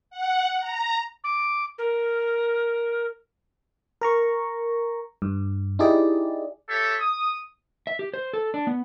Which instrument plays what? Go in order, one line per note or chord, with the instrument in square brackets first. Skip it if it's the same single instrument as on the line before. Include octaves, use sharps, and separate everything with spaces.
[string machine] F#5
A#5
[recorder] D6
A#4
[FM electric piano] A#4 A#5 C#6
G2
D#4 E4 G4 G#4 D5
[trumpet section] G4 A4 C#5 E5
D#6
[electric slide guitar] E5
G4
C5
A4
D4
B3